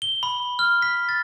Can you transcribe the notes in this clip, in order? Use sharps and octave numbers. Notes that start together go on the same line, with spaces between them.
G7
B5
F6
B6
A6